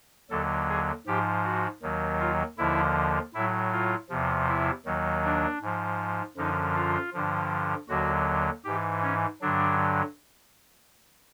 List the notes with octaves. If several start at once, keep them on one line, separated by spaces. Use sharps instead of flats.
D#2 D3 F#3 A4
G#4
G#2 F3 G4
F#4
D#2 D#3 F#3
F4
D#2 D3 F3 E4
A2 F#3 E4
F4
E2 C3 F3
E4
D#2 D#3 F#3
D4
G#2 F3
F#2 D3 F3 D#4
F4
G2 D3 F3
D#2 D3 F#3 F#4
G#2 E3 G4
C#4
G2 D3 F#3 D4